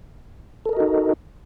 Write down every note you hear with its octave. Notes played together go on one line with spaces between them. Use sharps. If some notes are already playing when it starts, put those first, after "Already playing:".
D#4 F#4 A4 A#4 D#5